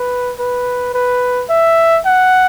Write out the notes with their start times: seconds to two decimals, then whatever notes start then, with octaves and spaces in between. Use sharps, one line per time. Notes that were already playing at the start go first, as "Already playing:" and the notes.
Already playing: B4
0.39 B4
0.94 B4
1.50 E5
2.05 F#5